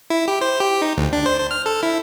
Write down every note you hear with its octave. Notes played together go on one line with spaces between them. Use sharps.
E4
G4
C5
G4
D#4
D2
D4
C5
C5
F6
A4
E4